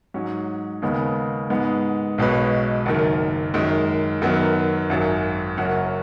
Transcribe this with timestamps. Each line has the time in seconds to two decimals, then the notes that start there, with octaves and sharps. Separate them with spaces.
0.14 G#2 F#3 C#4
0.82 D#2 C#3 G#3 B3
1.50 G#2 G#3 B3
2.18 B1 B2 G#3 C#4 B4
2.86 F#1 F#2 D#3
3.54 F#2 D#3 G#3
4.22 F#2 D#3 F#3 B3
4.90 G#1 F#2 F#3
5.57 F#1 F#2 F#3 C#4 F#4